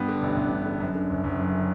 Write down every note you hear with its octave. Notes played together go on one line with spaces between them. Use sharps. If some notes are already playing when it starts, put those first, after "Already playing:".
Already playing: G2 B3
D3
A1
A1
G2
D3
F#2
D3
F#1
F#1
F#2
D3